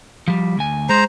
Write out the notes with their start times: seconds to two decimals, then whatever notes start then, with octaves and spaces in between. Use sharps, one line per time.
0.28 F3 G3
0.58 D2 G#5
0.89 G#3 C5 A#5